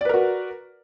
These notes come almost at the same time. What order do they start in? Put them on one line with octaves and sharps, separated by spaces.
D5 B4 A#4 F#4